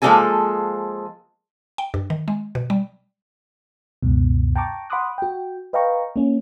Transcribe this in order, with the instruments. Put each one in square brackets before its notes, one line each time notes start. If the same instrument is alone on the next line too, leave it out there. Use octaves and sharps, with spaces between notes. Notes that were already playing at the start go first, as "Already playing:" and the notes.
[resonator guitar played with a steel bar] F3 G#3 A#3 D#4 A4 G#5
[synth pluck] G5
G2
D#3
G#3
B2
G3
[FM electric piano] C#2 F#2 B2
G5 A5 A#5 C#6 D6
F#5 B5 C6 D6 D#6 F#6
F#4 G5
B4 D#5 F5 G5 A#5 C#6
A#3 C#4